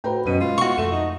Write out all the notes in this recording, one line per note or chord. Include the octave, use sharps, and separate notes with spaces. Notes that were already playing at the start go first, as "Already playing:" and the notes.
A2 F#4 B4 C5 G5 A#5
F#2 B2 F#3 C#4 B4 D#5 D#7
G#3 F4
B2 E4 F#4 C#6
F2 A3 E7
D#4